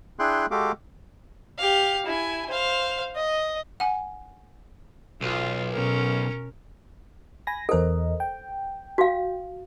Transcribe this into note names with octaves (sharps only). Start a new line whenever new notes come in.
D4 E4 G#4 G5 C6 F#6
G#3 F#4 G4 A4 F5 D6
G4 F5
E4 G#5
C5 F5
D#5
F#5 G#5
B1 F4
B2 C#4 A#4
G#5 B5 A#6
E2 A4 A#4 C5 D#5
G5
F#4 F5